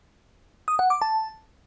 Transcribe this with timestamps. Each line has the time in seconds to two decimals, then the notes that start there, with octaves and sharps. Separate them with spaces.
0.68 D#6
0.79 F#5
0.90 D6
1.02 A5